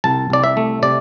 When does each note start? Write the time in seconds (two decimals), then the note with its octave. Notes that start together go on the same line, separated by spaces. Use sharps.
0.04 C2 A5
0.30 C2 D5
0.44 E5
0.57 A3
0.82 C3 D5